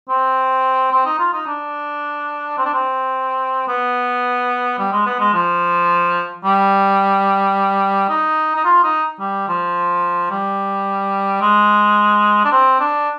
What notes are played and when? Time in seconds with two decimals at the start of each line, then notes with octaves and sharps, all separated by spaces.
0.09 C4
0.92 C4
1.05 D#4
1.19 F4
1.33 D#4
1.47 D4
2.57 C4
2.65 D4
2.73 C4
3.68 B3
4.78 G3
4.92 G#3
5.06 B3
5.19 G#3
5.34 F3
6.44 G3
8.09 D#4
8.56 D#4
8.65 F4
8.83 D#4
9.20 G3
9.48 F3
10.30 G3
11.41 G#3
12.44 D4
12.52 C4
12.80 D4